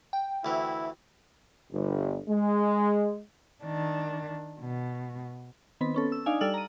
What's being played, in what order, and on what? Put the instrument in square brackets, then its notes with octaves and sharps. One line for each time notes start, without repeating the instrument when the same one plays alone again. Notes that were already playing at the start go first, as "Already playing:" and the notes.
[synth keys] G5
[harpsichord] D2 E3 [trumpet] E4
[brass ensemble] G1
G#3
[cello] D#3 D4
B2
[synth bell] D#3 B3 C4 B4 B5
B3 C#4 A4
E6
D4 D#4 D5 F5 G#5
G3 A4 D5 E6 F6 F#7
A#5 D#7